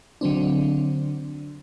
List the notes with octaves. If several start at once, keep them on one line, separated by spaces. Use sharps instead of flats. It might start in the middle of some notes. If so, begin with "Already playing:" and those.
D3 F#3 C4 D4